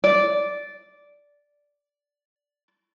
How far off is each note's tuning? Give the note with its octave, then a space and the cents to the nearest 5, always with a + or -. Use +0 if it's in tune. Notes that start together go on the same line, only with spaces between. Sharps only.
D5 -10